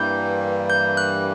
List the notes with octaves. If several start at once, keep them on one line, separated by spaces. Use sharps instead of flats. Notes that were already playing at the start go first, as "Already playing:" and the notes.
Already playing: G2 E3 G3 A#3 G6
G6
F#6